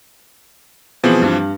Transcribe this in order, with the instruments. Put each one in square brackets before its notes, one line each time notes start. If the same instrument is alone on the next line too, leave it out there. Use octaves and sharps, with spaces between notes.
[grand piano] B2 G#4 F#7 [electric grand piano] E3 F3 C4
[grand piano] G2